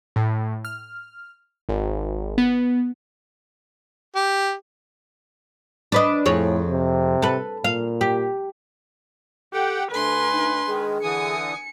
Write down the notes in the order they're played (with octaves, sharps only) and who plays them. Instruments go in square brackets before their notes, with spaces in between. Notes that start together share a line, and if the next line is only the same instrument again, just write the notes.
[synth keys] A2
F6
G#1
B3
[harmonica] G4
[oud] D4 B4 D#5
[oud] F2 G#4 C#5 [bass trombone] A2
[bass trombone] C3
[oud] A4 B4
[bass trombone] A#2 [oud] F5
[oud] G4
[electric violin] G4 [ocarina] A4 [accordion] F#5 G5
[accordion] D2 [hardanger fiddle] D4 C6 [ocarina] A4 [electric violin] B4 G#5
[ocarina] D#4
[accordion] D#3 G#3 [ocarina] G#4
[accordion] D3 E3 D#6 [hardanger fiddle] G#5 [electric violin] C#7